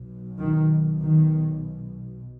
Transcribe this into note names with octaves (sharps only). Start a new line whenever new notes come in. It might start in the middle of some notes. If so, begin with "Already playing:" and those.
Already playing: B1 B2
D#3
D#3